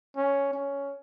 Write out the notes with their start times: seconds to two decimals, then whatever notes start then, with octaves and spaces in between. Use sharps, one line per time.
0.16 C#4
0.54 C#4